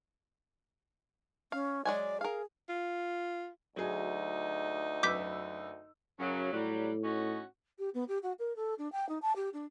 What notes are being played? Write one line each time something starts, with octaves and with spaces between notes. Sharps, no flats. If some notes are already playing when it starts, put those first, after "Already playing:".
C#4 F5
F#3 G#3 D5 G#5
G#4 A#4 F5
F4
D2 F#3 D#4 G#4
F#2 B4 D6 E6 G6 B6
F#2 C#3 F#3
A2 F#3 G3
C#4 D#4 F#4
G4
B3
G4
F#4
A#4
A4
D4
G5
D#4
A5
G4
D4